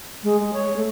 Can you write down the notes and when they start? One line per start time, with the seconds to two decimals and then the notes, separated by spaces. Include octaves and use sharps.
0.24 G#3
0.40 G#3
0.53 C#5
0.76 A3